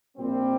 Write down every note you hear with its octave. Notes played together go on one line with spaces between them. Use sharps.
A#1 A#2 G3 C4